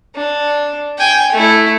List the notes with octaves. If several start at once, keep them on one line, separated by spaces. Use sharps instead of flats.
D4
G5 G#5
A3 E4